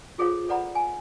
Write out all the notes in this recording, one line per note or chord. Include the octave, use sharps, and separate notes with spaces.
F4 G#4 A4 C5 C#5 F5
A4 B4 D5 F#5 A#5 B5
G#5